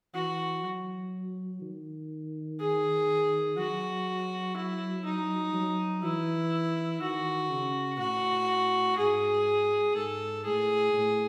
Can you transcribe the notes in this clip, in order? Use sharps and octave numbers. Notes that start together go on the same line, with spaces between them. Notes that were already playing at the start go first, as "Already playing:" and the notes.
E3 F#4
F#3
D#3
G#4
F#3 F#4
E4
D#4
F#3
E3 E4
D#3 F#4
C#3
A2 F#4
G#2 G#4
G#2 A4
A2 G#4
A2